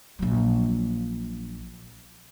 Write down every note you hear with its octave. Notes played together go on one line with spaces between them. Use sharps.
A#1 F#3